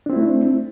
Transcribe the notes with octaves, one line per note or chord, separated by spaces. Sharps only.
A3 C4 D4 E4